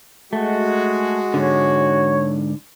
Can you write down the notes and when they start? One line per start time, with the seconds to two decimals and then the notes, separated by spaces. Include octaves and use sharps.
0.33 G#3 A3 F#4
1.34 G#2 D3 C#5